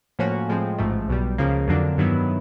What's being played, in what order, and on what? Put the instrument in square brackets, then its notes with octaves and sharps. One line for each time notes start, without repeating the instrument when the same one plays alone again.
[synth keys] A2 F3 A#3 C#4 F#4
A2 F3 G#3 C4
A1 G#2 F3 A3
B1 B2 G3
C#2 C#3 F3 A#3
F2 D3 F#3 A#3 D4
G2 D#3 F#3 B3 E4